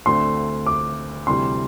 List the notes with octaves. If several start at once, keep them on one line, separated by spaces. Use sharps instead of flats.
D2 D3 A3 C4 C6
D6
D2 C3 E3 G3 C6